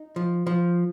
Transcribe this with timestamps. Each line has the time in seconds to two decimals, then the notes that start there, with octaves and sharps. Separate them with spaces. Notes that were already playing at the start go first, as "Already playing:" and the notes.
Already playing: D#4
0.16 F3
0.47 F3